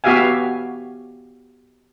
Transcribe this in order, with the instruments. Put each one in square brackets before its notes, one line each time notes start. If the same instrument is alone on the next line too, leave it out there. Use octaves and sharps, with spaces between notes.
[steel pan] B3 F#4 G4 E5 F5 G#5